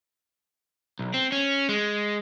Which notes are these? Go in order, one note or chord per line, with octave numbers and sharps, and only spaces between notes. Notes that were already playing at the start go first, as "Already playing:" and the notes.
B1
C4
C#4
G#3